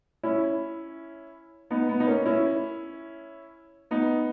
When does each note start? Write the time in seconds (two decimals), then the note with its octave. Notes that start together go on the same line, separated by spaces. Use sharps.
0.23 C#4 E4
1.70 B3 D#4
1.89 B3
2.00 D#4
2.07 A#3 C#4
2.26 C#4 E4
3.91 B3 D#4